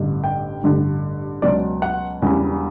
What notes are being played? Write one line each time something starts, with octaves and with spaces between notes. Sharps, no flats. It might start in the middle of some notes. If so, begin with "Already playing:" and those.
Already playing: A1 G2 D3
G5
A1 G2 D3
C#2 B2 F#3 D5
F#5
E1 E2 C#3 G3